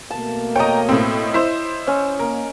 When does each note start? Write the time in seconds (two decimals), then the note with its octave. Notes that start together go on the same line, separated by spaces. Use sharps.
0.11 B2 A3 A#3 A5
0.56 C#5 D#5 G5 A#5
0.89 A2 C4
1.34 E4 C5
1.87 C#4
2.19 A#3 A#4